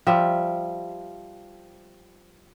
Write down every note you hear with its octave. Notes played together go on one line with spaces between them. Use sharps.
F3 G3 E5